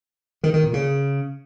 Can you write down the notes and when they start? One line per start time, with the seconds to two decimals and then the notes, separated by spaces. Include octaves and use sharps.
0.43 D#3
0.53 D#3
0.63 A#2
0.74 C#3